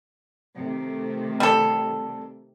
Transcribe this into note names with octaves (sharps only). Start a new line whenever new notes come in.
C3 D#3 A3
G3 A4